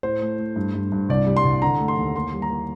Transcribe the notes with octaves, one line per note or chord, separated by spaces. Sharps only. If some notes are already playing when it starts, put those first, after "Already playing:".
A2 C5
A3
A3
G2
G2
G2
C2 D5
G3
C6
C2
D3 A#5
A3
C6
D#2
A#3 C6
G3
A#5
A#3